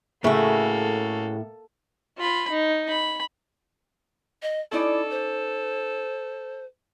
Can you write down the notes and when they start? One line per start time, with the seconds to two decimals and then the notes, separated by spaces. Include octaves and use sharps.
0.24 A2 C#3 A3 A#3 F#4 A4
2.18 F4 B5
2.50 D#4
2.89 B5
4.42 D#5
4.72 C#4 D#4 E4 A4 D5
5.10 C5